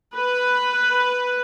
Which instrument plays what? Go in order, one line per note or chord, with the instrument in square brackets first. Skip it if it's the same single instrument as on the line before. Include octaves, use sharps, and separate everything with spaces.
[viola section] B4